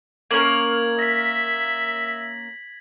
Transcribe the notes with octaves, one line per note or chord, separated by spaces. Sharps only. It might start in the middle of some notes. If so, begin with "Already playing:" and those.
A#3 C#4 A#4 G#6 F#7
E5 A#6 B6